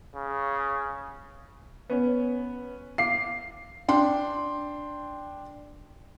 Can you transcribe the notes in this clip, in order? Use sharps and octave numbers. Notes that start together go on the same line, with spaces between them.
C#3
B3 C#4
F5 D6 C7
D4 G5 C6